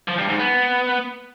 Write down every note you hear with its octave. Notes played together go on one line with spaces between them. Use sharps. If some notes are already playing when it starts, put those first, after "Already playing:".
F3
G2
G#2
B3